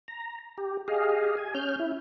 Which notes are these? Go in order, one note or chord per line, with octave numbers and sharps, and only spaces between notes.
A#5
G4
G4 G#4 D#5 F5
G#5
C#4 F6 G6
E4